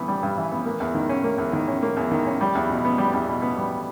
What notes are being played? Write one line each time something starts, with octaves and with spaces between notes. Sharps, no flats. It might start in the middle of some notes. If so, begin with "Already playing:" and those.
Already playing: G2 E3 B3
G3
G2
E3
B3
A#3
E2
D#3
C#4
A#3
E2
D#3
C#4
A#3
E2
D#3
C#4
G3
E2
B2
B3
G3
E2
B2
B3
G3